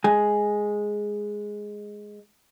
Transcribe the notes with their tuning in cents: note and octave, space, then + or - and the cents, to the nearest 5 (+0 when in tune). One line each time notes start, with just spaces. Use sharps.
G#3 +0 G#5 +0